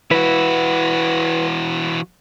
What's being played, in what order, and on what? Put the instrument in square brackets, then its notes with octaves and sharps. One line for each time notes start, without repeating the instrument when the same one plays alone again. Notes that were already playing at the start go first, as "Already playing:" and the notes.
[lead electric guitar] E3 F#4 [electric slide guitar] E4 B4